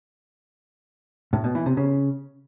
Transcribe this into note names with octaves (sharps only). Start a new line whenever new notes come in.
A2
B2
E3
C3
C#3